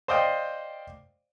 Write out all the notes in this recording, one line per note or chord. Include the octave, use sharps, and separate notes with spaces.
C5 D5 D#5 F5 G5